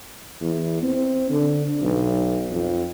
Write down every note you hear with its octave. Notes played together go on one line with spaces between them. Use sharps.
E2
C4
D3
B1
F2